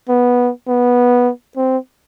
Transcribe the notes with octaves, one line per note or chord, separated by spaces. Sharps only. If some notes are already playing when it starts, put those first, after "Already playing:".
B3
B3
C4